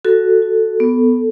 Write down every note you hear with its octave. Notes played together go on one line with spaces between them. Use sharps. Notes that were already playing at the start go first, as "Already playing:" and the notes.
F#4 A4
F#4
B3